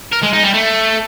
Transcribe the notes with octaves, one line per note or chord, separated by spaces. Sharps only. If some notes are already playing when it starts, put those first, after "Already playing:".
A#4
G#3
D#4
G3
A3